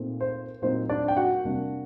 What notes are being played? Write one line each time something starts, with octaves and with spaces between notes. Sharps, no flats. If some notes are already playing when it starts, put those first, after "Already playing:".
Already playing: A#2 A3 C4 D#4
C5
A#2 F#3 C4 D#4 C5
D4 D5
G5
F#4 F#5
C3 G3 A#3 D4